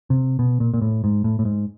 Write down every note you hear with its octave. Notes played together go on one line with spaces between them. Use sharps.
C3
B2
A#2
A#2
A2
G#2
A2
A2
G#2